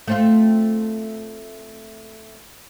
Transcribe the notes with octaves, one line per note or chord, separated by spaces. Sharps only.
A3 C4 F4